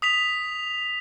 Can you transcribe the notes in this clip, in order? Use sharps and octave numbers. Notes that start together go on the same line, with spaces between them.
D#6 B6 F7